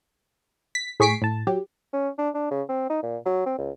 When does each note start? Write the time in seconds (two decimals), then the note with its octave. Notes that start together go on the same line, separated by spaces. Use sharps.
0.75 B6
1.00 A2 G#4 C#6 B6 C7 D7
1.22 A2 A5
1.47 F#3 G4
1.93 C#4
2.18 D4
2.34 D4
2.51 C#3
2.69 C4
2.90 D#4
3.03 A#2
3.26 F#3
3.46 C4
3.58 C#2